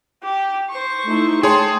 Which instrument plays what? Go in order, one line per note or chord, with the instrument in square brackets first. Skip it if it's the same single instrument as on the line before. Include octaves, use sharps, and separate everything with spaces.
[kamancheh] G4
C5 C#6
[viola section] A3 D#4 E4
[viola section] A3 A5 [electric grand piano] G#4 C#5 C6 [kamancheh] G5